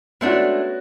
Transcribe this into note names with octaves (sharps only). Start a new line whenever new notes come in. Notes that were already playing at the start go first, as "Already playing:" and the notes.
G#3 A3 B3 C#4 D4 F#4